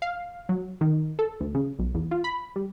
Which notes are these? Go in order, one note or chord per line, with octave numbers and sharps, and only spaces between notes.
F5
F#3
D#3
A4
D2
C#3
B1
E2
F4
B5
G3